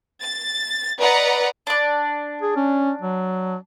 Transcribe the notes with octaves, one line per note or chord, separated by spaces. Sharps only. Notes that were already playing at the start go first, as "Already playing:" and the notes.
A6
B4 D5 D#5 F#5 A#5
D4 D5
G#4
C#4
F#3